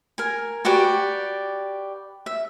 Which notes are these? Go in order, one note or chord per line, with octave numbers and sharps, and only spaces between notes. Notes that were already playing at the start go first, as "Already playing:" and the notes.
A#4 G#5
F#4 G4 B4 D5
E5